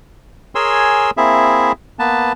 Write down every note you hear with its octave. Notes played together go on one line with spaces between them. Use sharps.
G#4 A#4 C#5 G#5 C6 E6
A#3 C4 E4 G#4 E5
A#3 B3 B4 A5